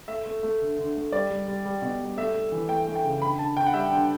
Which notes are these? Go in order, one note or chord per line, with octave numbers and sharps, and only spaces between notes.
A3 E5
A3
A3
D3
D3
A3
G3 D5
G3
G3
G3
B2
G3
A3 E5
A3
E3
A3 G5
A3
G5
C#3
D3 B5
D3 A5
D3 G5
F#5
G3 E5
D3